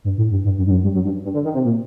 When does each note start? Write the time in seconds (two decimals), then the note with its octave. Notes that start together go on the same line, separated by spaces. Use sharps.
0.04 G2
0.18 A2
0.31 G2
0.44 G2
0.58 F#2
0.67 G2
0.71 F#2
0.84 G2
0.94 F#2
1.05 G2
1.24 G2
1.34 D3
1.45 D#3
1.54 C3
1.65 A#2